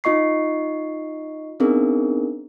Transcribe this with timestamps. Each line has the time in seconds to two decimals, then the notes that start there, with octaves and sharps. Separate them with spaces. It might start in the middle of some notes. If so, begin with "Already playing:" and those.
0.04 D#4 F4 D#5 C#6 C7
1.60 B3 C4 D4 D#4 G#4 A#4